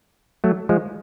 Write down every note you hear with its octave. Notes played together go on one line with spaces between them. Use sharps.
F#3 A3
F3 G#3